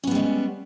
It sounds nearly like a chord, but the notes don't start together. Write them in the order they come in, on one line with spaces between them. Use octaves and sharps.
C#4 B3 G3 G#3